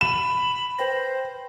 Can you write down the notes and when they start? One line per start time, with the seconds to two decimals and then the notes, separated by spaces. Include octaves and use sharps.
0.01 B5 E7
0.79 B4 C5 G5 A#6